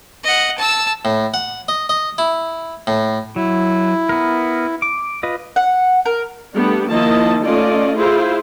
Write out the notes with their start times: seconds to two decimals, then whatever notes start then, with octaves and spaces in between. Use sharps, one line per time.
0.24 D#5 F#5
0.58 A5 E6
1.05 A2
1.34 F#5
1.68 D#5
1.89 D#5
2.18 E4
2.87 A2
3.36 F#3 E4
4.09 B3 A#4
4.82 D6
5.23 F4 B4 D#5
5.56 F#5
6.06 A#4
6.54 G3 A3 B3 D4 G4
6.90 D#3 F3 A#3 E4 D#5 A5
7.44 A3 C#4 F4 D5 D#5
7.96 E4 F4 G#4 C5